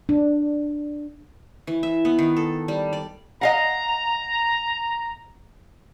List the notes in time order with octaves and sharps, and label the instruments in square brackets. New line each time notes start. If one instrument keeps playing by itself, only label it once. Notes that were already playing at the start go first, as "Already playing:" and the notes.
[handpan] D4
[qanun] E3
E5
B3
D#3
A4
G3
D5
[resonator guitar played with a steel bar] D#5 F5 F#5 [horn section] A#5